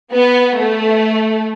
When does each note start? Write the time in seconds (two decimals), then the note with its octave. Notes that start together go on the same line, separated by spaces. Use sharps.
0.12 B3
0.59 A3